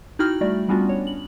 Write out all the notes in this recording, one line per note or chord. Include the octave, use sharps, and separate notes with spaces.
D#4 E4 F#4 G5 F6 F#7
G3 A3 F#4 D5
G3 B3 C#4 D4 F4 F#4
C#5
F#7